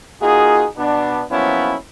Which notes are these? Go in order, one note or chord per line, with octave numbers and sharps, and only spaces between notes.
A#3 D#4 F4 F#4 G#4
B2 B3 D4
F3 F#3 A#3 B3 C#4 E4